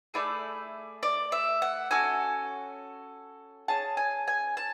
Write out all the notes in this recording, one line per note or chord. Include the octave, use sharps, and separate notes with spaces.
A3 E4 G#4 D5
D5
E5
F#5
C#4 F#4 A4 G#5
C#4 G#4 A5
G#5
G#5
A5